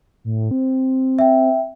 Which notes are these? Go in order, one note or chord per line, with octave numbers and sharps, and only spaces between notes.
A2
C4
E5 G5